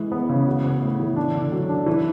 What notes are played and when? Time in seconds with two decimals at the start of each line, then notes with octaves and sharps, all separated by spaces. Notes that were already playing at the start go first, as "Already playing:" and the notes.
Already playing: E3 G#3
0.12 B3
0.29 C#3
0.47 F#4
0.64 B3
0.82 A2
1.00 E3
1.16 D4
1.35 D3
1.52 F#3
1.69 D4
1.86 E3